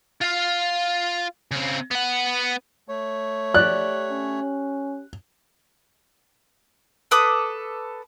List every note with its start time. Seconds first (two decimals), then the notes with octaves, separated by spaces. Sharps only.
0.21 F4 F5
1.51 C#3 C4
1.91 B3 F#5
2.88 A3 C#5
3.54 G4 D5 F#6
4.10 C#4
7.11 A4 B4 D6 D#6